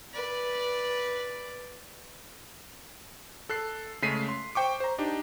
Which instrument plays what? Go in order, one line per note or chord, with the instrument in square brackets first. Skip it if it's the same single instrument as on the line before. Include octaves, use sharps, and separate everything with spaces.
[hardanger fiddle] B4 D5
[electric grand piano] A4 F#6 C7
C#3 G#3 A3 B6 C7 D#7
C6
C5 G5 C#6 D6
C5 A#5
D4 D#4 G4